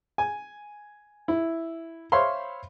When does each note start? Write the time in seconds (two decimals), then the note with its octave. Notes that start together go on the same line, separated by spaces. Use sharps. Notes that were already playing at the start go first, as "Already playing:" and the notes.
0.18 G#5
1.28 E4
2.12 C5 C#5 E5 F5 B5 C6